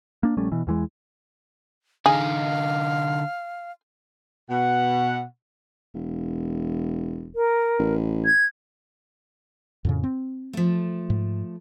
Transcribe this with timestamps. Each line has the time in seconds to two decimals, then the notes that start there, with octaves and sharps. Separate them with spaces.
0.23 A#3 D4
0.37 A#1 G3 A3 C#4
0.52 B2 E3
0.67 E2 E3 G#3
2.06 D3 D#4 G#4 F5
4.50 B2 F#5
5.95 E1
7.35 A#4
7.79 A1
8.25 G#6
9.85 F2 A2 C#3
10.04 C4
10.53 F3 A3
11.10 G#2